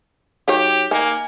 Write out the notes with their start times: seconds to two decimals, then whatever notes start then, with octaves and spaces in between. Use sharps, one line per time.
0.48 F#3 D#4 G4 C#5
0.91 D#3 A#3 G#5